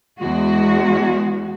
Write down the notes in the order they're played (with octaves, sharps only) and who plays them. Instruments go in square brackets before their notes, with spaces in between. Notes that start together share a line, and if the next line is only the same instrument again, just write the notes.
[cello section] E2 G#3 F#4